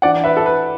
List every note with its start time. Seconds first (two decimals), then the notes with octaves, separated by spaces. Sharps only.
0.02 E3 D4 D5 F#5
0.24 B4 E5
0.37 A4
0.46 B4